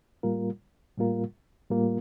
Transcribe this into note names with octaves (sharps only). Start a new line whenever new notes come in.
A2 G3 A#3 F4 A#4
A2 G3 A#3 F4 A#4
A2 G3 A#3 F4 A#4